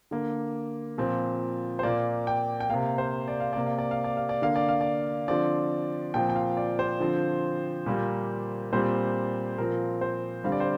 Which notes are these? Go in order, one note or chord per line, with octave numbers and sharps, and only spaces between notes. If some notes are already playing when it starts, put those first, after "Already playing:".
D3 A#3
A#2 F3 C4
C5
A#2 A#3 D5
G5
G5
C3 A#3 F5
C5
D5
F5
C3 A#3 D5
F5
D5
F5
D5
F5
D5
D3 A#3 F5
D5
F5
D5
D3 F3 C4 D5
A#2 F3 C4 G5
G5
F5
D5
C5
D3 F3 C4
A#2 G3 A#3
A#2 G3 C4 C5
A#2 F3 C4 A#4
C5
D3 G3 C4 F5
D5
C5